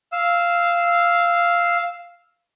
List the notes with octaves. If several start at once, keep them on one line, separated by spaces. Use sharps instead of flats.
F5 E6